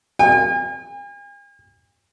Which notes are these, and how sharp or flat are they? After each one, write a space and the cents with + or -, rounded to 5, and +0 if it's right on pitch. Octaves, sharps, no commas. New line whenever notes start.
G#5 -45